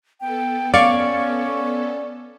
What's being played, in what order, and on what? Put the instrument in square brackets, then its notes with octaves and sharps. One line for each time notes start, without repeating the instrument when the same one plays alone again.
[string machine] B3 A4 [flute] G5
[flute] C#4 [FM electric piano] D5 C#6 [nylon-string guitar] F5